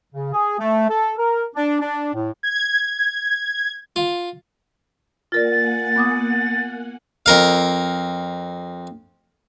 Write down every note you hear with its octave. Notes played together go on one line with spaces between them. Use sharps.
C#3
G#4
A3
A4
A#4
D4
D4
A2
G#6
F4
A#3 F4 A#4 D5 F#5 G#5 A6
B3 D6 D#6
F2 A#4 F5